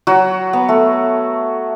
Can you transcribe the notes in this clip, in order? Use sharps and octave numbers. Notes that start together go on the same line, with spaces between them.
F#3 F#4
B3
A3